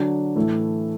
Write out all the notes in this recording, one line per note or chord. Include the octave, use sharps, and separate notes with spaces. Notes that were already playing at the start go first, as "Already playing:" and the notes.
Already playing: D3 F#3 D4
A2 E3 A3 E4